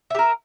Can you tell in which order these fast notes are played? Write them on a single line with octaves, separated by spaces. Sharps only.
E5 G4 A#4